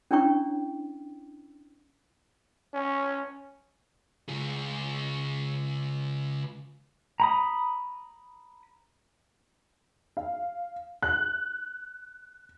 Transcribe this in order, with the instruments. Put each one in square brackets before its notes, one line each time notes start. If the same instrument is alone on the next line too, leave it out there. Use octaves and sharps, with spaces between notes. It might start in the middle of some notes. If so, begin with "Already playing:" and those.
[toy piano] C#4 D4 E4 C#5 G5 C#6
[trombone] C#4
[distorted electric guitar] C#2 G#4
[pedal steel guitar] A#5 B5 D#6
[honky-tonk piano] F5
F#6